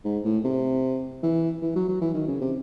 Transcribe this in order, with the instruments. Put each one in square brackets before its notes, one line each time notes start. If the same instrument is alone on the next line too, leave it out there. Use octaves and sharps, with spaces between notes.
[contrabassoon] G#2
A2
C3
E3
E3
F#3
F#3
E3
D#3
C#3
C3